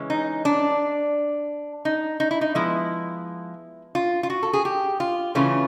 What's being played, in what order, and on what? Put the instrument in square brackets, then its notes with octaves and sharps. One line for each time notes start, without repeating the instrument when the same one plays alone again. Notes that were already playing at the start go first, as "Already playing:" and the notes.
Already playing: [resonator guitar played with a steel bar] C#3 E3 G#3 C#4
D#4
D4
D#4
D#4
E4
D#4
F3 G#3 B3 E4
F4
F4
F#4
A4
G#4
G4
F4
C#3 E3 A3 C#4 F4